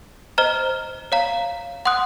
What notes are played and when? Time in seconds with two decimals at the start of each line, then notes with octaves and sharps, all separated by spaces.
0.38 C5 D#5 A#5 F6
1.12 C#5 F5 A#5
1.85 F#5 C6 D#6 F#6